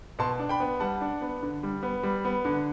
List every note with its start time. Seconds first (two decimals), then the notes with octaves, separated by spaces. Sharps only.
0.19 B2 A5 C6
0.39 D4
0.49 G5 B5
0.60 B3
0.80 G3 F#5 A5
1.01 D4
1.22 B3
1.43 D3
1.63 G3
1.83 B3
2.03 G3
2.25 B3
2.45 D3